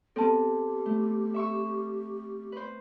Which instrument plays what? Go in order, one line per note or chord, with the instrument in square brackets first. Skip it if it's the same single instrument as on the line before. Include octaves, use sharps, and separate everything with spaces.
[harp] B3 C4 [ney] G4 [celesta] A4 A5
[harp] A3
E5 C#6 E6
B4 C5